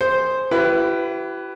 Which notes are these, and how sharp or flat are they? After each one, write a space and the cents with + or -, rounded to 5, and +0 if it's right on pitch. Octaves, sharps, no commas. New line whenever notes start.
G#4 +0 C5 +0
E4 +35 G4 -35 B4 +10